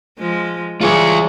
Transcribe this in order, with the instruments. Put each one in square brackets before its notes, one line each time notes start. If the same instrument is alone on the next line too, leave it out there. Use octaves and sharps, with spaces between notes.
[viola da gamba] F3 G#3
[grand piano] E3 G#3 [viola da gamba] G3 [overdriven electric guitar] F4 C#5